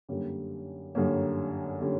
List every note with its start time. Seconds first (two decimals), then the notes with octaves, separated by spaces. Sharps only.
0.09 F#2 D3 G3 A#3 C#4
0.95 F#2 D3 G3 A#3 C#4
1.81 D3 G3 A#3 C#4